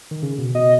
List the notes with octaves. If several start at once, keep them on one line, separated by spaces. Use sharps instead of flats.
D#3
C#3
B2
B2 D#5